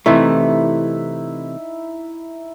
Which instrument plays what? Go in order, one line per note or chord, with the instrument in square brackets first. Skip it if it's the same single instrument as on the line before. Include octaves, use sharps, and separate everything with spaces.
[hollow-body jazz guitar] C3 E3 A3 [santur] D#4 E4